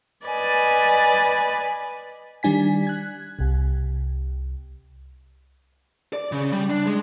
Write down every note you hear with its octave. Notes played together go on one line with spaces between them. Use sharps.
B4 D5 D#5 G#5
D#3 G3 D4 G#5 B6
F#6 G#6
C2 C3
D5
C#3
G3
D4
G#3